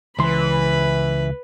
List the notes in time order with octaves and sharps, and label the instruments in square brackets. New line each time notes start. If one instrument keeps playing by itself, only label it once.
[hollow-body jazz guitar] C#2 C6 [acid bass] E3 [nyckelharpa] B4 B5